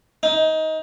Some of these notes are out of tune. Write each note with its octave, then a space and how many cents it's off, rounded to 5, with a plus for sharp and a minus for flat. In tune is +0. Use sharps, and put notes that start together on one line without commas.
D#4 +20